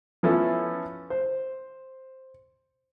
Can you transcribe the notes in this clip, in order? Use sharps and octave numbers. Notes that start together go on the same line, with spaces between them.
F3 B3 C#4 E4 A4
C5